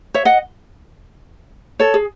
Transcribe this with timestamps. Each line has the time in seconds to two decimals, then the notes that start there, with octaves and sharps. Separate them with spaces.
0.14 C#5 E5
0.25 D#5 F#5
1.79 A4 C#5
1.94 G#4